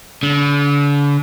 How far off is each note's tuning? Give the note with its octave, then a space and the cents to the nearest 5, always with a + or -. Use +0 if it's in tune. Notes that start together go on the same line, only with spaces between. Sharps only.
D3 -40